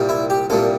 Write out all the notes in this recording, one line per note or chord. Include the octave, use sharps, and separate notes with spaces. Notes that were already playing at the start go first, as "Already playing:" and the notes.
Already playing: C2 A#2 G3
E4
G4
C2 A#2 G3 A4